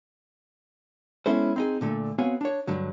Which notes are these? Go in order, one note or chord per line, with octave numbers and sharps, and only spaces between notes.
G#3 B3 C#4 E4 A4 C5
C4 D#4 G#4
A#2 D3 A3
B3 C4 F#4 C#5 F5 G#5
D4 C#5
G2 D3 F#3